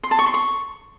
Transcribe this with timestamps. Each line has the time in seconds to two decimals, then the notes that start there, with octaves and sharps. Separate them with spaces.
0.03 C6
0.11 A5
0.19 C#6
0.26 C6
0.34 C#6